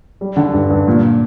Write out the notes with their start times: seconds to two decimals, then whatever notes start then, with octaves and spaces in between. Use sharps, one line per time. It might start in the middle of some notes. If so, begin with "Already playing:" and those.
0.21 G3
0.37 D3
0.54 G2
0.70 G2
0.88 A#2